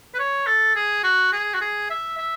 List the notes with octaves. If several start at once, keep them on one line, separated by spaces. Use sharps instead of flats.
B4
C#5
A4
G#4
F#4
G#4
F#4
G#4
E5
E5